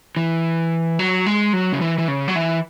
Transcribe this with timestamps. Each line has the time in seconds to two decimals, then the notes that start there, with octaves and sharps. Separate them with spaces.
0.17 E3
0.99 F#3
1.26 G#3
1.53 F#3
1.73 C#3
1.81 E3
1.98 E3
2.08 C#3
2.28 F#3
2.35 E3